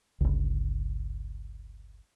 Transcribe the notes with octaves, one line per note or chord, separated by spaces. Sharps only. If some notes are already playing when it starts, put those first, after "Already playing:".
G1 C#2